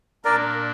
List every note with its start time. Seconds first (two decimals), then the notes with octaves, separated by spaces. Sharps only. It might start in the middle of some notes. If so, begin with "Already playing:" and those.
0.24 A#2 A#3 D4 A#4 D5